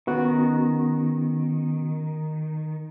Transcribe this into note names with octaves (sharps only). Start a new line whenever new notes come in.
D#3 B3 C#4 F#4